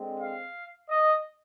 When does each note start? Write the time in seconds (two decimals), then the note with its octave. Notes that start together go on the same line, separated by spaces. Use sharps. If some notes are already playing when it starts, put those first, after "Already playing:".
Already playing: D3 G#3 C4
0.20 F5
0.90 D#5